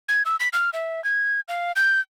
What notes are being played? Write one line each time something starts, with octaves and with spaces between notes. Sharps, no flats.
G#6
E6
B6
F6
E5
G#6
F5
G6